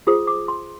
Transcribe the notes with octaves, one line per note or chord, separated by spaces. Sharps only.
F4 G#4 C5 D#6
D6
C6